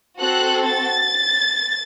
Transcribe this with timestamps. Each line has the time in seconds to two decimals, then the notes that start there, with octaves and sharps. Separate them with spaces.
0.19 C4 F#4 A4 F#6
0.65 A6